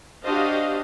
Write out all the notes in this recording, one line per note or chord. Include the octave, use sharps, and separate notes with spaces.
D4 F#4 G4 C5 D#5 F5